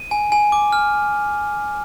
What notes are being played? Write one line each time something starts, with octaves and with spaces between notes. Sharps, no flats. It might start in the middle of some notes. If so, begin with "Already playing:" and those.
Already playing: D#7
G#5
G#5
D6
F6